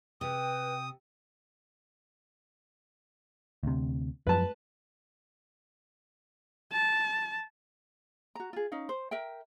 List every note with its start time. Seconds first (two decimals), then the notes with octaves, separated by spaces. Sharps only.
0.21 C3 B4 G5 D#6
3.63 D2 C3
4.27 F#2 F3 B4 A5
6.73 A5
8.35 F#4 A#5
8.53 F4 G#4
8.72 C#4 D#4 F5
8.89 C5
9.11 A#4 E5 G5